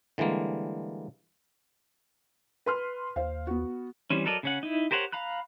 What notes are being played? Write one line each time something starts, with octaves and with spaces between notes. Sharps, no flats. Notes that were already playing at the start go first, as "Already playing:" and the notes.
D3 E3 G3 G#3 A#3
B4 C6 F6
D#2 C5 F5
B3 F#4
E3 G3 C4 C#4
F#3 A4 A#4 D5 D#5
C#3 C#4 F#5
D#4 E4
G4 A#4 C5 C#5 F#5
F5 A#5 B5 F#6